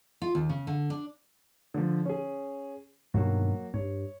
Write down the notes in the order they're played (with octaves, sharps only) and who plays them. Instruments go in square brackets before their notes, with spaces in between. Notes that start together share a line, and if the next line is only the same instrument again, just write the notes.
[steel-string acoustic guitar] F4
D#2
C#3
D3
D4
[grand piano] D3 F3
C#4 G#4
[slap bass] G2 B2 D#3 [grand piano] F#3 A#3 F#4
[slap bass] G2 [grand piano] C#5